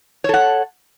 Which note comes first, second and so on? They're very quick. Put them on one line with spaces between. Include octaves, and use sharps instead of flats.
C#5 A4 F#5